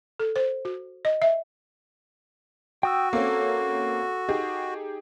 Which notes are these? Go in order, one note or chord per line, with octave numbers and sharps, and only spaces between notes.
A4
C5
F#4
D#5
E5
F#4 G5 D#6 E6
A#3 C4 C#4 A4
D#4 G4 G#4